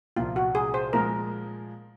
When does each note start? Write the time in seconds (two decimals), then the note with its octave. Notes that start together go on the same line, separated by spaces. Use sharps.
0.16 C2 A#2 F3 F4
0.36 F#4
0.55 G#4
0.74 C5
0.93 A#2 F3 G#3 A#4